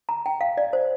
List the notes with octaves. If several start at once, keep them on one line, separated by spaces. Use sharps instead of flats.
A#5
G5
F5
D5
C5